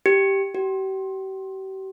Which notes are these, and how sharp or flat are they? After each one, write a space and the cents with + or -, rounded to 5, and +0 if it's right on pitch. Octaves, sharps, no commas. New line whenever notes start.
G4 -5
G4 -40